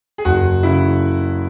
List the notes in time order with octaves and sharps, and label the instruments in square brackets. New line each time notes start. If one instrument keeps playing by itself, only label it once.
[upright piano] G#4
[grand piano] F#1 [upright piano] F#4
[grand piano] C#3 [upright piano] E4